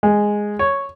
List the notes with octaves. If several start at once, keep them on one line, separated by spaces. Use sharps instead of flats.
G#3
C#5